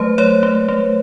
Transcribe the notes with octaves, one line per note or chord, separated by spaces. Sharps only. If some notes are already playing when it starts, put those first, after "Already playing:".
Already playing: F#3 A3 B4 C5
A3 C#5
A3
A3